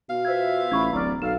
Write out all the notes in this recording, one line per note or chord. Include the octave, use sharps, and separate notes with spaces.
B2 F5
F4 B4 C5 E5 G#6
A1 B5 C#6 G#6
D1 D5 A#5 F6
B1 A4 F5 E7